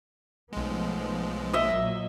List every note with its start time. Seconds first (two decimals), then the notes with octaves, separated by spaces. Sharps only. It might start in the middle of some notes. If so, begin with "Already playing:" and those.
0.53 B1 F3 G#3 A3 B3
1.53 A#2 F#3 A#3 D#5 E5